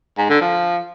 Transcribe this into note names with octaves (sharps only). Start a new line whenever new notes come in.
G#2
D3
F3